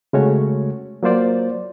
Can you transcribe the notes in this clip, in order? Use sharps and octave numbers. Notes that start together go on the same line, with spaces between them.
C#3 G#3 A3 C#4 F#4 C#5
F#3 A#3 F4 C5 D5